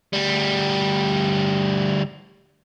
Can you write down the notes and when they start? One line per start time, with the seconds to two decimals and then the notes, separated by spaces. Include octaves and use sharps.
0.13 D2 G3